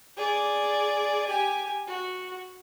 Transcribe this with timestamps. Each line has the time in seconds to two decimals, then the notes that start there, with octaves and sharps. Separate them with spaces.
0.17 G#4 D5
1.27 G4 G#5
1.87 F#4